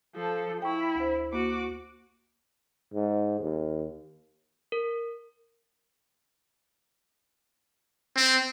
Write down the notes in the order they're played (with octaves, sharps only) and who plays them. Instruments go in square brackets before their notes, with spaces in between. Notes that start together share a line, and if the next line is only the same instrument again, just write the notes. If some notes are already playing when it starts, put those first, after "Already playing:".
[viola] F3 A4
[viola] E4 [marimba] G5 C#6
[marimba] D2 C5
[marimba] A#3 [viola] F#4 D6
[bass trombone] G#2
D#2
[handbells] A#4
[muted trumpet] C4